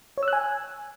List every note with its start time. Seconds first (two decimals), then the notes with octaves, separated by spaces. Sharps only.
0.18 C#5
0.23 E6
0.28 F#6
0.33 G#5